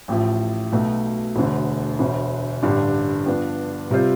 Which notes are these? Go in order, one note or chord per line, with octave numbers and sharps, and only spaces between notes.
A1 A2 F3
B1 B2 A3
E1 D2 D3 A3
E1 D2 D3
A1 G2 D3 G3 D4
G2 F3 B3 D4
C3 G3 C4 F4 C5